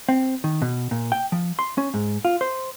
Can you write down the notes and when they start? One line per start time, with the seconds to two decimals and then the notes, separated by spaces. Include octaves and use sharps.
0.09 C4
0.44 D#3
0.62 B2
0.91 A#2
1.12 G5
1.32 F3
1.59 C6
1.78 C#4
1.94 G#2
2.25 F4
2.41 C5